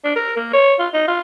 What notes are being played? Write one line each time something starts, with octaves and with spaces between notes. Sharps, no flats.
D4
A#4
A#3
C#5
F4
D#4
F4